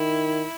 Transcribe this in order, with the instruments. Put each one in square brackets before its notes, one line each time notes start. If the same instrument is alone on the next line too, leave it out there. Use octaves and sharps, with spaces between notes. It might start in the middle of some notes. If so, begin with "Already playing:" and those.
Already playing: [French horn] D#3 [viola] E4